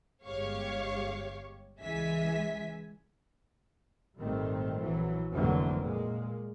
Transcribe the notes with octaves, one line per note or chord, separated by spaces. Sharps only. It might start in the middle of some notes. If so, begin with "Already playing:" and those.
G1 G#3 G4 C#5 F5 C#6
C#2 E3 G#3 E5 G#5 B6
G#1 A#2 D#3 G3 A3 C4
A#1 E3 F#3
F1 F2 D3 E3 F#3 A#3
A#2 G#3 A#3